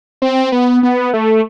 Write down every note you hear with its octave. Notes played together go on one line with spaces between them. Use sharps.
C4
B3
B3
A3